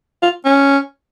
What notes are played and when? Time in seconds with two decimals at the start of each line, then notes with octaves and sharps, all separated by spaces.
0.23 F4
0.45 C#4